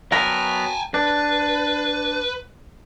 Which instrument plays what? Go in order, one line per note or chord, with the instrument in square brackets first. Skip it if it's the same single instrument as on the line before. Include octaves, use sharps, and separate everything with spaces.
[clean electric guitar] F#3 B3 A#4 [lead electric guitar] G5 G#5
[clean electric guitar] D4 [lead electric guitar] B4